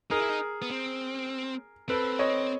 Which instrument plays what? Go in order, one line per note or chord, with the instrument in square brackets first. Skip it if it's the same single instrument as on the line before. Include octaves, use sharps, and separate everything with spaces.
[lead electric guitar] D#4 [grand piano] G#4 A#4
[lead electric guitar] E4
D#4
B3
C4
[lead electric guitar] C4 [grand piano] A4 B4
[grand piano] C#5 D#5